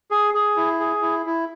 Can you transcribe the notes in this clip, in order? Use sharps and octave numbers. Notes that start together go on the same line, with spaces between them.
G#4
G#4
E4
G#4
E4
E4